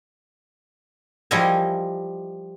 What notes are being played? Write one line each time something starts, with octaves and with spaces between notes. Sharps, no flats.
F3 G3 E4 A#4 D#5 G#5